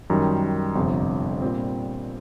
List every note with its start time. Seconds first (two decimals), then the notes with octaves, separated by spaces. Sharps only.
0.10 F#2 D#3 G3
0.75 G1 F2 C3
1.42 A#2 G3 C4